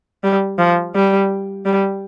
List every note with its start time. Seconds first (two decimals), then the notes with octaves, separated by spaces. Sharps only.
0.24 G3
0.59 F3
0.95 G3
1.66 G3